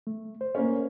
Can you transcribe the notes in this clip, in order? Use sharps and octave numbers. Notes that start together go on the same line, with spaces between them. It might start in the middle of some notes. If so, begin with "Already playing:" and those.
A3
C5
A#3 C#4